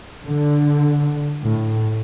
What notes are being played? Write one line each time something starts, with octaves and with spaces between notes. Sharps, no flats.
D3
A2